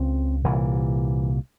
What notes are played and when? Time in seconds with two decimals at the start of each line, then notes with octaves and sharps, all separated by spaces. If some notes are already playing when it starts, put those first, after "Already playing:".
Already playing: C#2 C#3 C4
0.44 C2 A#2 E3